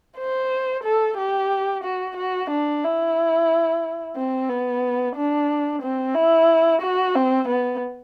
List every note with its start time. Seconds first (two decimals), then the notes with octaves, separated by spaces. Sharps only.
0.17 C5
0.84 A4
1.17 G4
1.84 F#4
2.17 F#4
2.50 D4
2.84 E4
4.16 C4
4.49 B3
5.16 D4
5.82 C4
6.15 E4
6.82 F#4
7.15 C4
7.48 B3